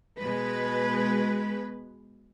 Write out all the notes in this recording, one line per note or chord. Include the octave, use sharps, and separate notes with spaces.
B2 G#3 B4